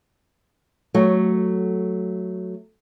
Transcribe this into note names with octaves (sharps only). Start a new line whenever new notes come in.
F#3 A3